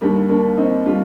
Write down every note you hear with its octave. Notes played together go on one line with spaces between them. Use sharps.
D#2 D3 G3 A#3 D4
A#3 D4
C4 D#4
D3 G3 D4 F4